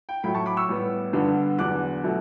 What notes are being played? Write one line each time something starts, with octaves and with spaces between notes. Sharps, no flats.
G5
A2 F#3 A3 G5 B5
A5 C#6
B5 D6
C#6 E6
A2 G3 B3
G2 D3 G3 B3
E2 D3 F#3 B3 D6 F#6
B2 F#3 A3